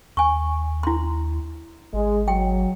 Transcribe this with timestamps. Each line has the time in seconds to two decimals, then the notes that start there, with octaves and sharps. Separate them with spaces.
0.17 D#2 G#5 C#6
0.83 E4 C6
1.94 G#1 G#3
2.28 F#3 G5